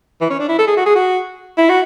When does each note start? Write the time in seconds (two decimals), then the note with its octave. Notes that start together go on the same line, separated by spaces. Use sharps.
0.21 E3
0.30 C#4
0.39 D4
0.49 E4
0.58 A4
0.67 G#4
0.77 F#4
0.86 G#4
0.95 F#4
1.58 E4
1.69 F#4